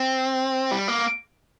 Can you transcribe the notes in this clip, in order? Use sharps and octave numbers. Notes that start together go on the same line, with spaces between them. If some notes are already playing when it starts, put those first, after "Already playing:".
Already playing: C4
G3
A#3